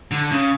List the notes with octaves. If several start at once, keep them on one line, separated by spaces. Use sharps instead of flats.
D3
C#3